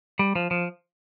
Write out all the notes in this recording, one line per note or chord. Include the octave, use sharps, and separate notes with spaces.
G3
F3
F3